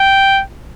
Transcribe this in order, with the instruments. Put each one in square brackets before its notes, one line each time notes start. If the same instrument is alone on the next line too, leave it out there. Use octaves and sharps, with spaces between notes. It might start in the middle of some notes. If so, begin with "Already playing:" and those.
Already playing: [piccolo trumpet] G5